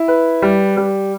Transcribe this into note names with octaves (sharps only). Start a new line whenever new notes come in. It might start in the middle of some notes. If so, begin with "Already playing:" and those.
Already playing: E4
B4
G3
G3